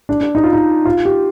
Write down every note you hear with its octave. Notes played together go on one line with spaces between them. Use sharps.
D4
D4
D#4
F4
D#4
F4
G4